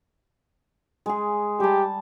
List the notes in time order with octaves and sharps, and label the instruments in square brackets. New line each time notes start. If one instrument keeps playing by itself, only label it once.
[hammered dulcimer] G#3 G#4
[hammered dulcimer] G3 A5 [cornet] G4